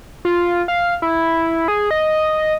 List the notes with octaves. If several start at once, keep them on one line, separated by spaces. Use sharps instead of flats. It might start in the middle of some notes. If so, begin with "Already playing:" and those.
F4
F5
E4
G#4
D#5